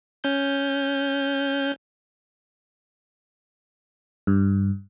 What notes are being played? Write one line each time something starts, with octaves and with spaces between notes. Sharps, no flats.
C#4 G6
G2